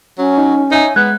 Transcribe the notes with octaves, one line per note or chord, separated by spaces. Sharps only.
F#3 C#4
D#4
D#4 C#5 E5 G#5
G#3 B3 F#6 G#6